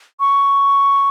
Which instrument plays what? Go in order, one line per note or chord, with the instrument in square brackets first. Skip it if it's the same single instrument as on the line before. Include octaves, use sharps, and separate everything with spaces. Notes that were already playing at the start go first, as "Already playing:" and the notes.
[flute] C#6